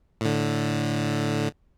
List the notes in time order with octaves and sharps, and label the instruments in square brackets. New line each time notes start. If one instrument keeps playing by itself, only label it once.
[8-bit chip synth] A2 D3